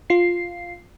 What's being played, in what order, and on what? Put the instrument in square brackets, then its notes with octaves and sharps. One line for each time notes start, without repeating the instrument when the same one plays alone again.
[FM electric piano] F4 C7